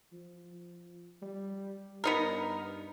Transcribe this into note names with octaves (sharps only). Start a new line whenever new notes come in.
F3
G3
G2 B3 D#4 A#4